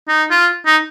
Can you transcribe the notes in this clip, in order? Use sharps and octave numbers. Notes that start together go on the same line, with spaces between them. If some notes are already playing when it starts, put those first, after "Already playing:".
D#4
F4
D#4